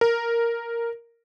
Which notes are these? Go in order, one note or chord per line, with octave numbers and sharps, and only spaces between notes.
A#4